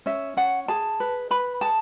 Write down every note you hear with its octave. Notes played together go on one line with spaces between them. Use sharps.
C#4 E5
C#4 F#5
G#4 A5
B4
B4 B5
G#4 A5